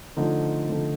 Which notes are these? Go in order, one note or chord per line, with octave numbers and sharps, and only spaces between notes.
D3 F3 A3 D#4
D3 F3 A3